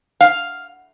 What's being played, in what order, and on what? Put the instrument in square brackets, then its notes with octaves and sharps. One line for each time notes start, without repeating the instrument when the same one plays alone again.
[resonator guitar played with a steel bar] F5